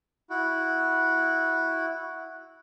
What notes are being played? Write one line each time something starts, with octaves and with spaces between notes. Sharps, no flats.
E4 F#4